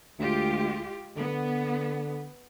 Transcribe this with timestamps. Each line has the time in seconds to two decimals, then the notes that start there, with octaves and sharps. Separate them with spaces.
0.19 D2 G#3 F4 G4
1.17 D3 B3